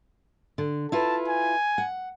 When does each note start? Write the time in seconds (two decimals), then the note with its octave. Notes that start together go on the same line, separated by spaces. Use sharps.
0.58 D3
0.92 E4 F4 B4 A5
1.28 G#5
1.78 F#5